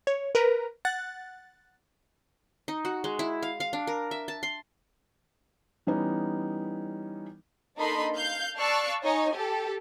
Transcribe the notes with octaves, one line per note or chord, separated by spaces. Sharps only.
C#5
A#4 B4 A#5
F#5 F#6 A6
D#4
F#4
G#3
E4
F5
F5
D4
A#4
E5
A5
C6
E3 G3 B3 C#4 D#4
A#3 D4 D#4 A4 B5 C6
F5 G6
D5 F5 A5 C#6 E6 F#6
D#4 C#5 G#5
G4 A4